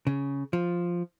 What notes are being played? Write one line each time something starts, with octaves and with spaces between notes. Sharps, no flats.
C#3
F3